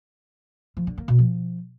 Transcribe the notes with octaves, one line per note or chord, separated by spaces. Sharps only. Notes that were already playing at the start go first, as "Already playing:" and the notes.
F3
D3
A#3
B2
F3